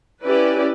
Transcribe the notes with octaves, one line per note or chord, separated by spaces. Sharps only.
C#4 E4 G4 B4 D5